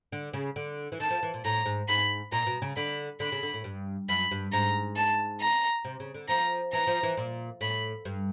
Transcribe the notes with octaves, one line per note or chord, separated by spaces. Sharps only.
D3
C#3
D3
E3
D#3 A5
F3
E3
A#2
A2 A#5
G#2
G#2 B5
A#2 A#5
B2
C#3
D3 B5
D3 B5
C#3
D3
A2
G2
F#2 B5
G2
G#2 A#5
A5
A#5
C3
C#3
D3
F3 A#5
E3 A#5
F3
E3
A#2
A2 B5
G2